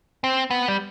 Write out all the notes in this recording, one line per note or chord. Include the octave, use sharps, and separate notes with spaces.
C4
B3
G3